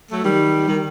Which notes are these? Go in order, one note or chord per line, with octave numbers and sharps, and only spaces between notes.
F#3 A3
D#3 G3
D#3